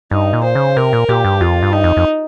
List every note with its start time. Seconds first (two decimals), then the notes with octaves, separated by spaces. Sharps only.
0.11 G2 D#4
0.33 A#2
0.44 C5
0.55 C#3
0.77 C3 A#4
0.93 A#2
1.09 A#2 G4
1.25 G2
1.41 F2 F4
1.63 G2
1.73 D#4
1.84 F2
1.97 F2